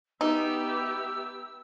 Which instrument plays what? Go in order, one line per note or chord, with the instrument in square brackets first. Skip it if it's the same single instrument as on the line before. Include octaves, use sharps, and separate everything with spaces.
[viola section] B3 G4 E5 [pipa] D#4 [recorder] E6